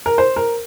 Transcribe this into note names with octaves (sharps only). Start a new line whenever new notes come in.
A#4
C5
A#4